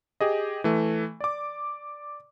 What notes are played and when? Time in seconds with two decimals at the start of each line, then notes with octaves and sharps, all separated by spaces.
0.21 G4 G#4 D#5
0.64 E3 A3
1.20 D5 D6